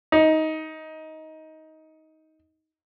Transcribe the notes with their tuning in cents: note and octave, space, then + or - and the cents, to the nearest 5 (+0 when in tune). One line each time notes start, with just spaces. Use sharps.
D#4 +15